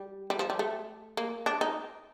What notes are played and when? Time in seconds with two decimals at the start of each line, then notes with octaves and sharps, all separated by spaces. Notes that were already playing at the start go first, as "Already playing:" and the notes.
Already playing: G3
0.30 G3
0.39 F3
0.50 G3
0.59 A3
1.17 A#3
1.46 D4
1.61 D#4